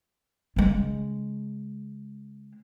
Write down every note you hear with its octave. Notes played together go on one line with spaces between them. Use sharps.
C#3 G#3